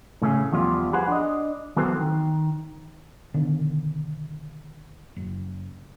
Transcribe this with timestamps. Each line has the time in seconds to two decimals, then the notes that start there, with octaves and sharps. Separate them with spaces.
0.22 A2 C#3 A3 C#4 G#4
0.52 E2 F3 G3 F4
0.93 G4 G#4 B4 C5 F#5
1.08 D4 D#5
1.77 E3 F#3 B3 C4 A4 C5
1.98 D#3
3.34 B2 D3 D#3
5.16 F#1